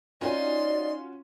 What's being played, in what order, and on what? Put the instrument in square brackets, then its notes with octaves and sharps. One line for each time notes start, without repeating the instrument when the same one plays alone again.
[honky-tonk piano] C#4 F4 F#4 [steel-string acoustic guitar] D#4 [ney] D5 [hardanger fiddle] C6